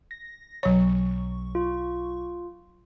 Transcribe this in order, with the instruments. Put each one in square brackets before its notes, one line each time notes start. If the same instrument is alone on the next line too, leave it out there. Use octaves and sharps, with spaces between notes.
[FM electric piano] A#6
[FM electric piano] B1 C#6 [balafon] F#3 C#5
[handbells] F4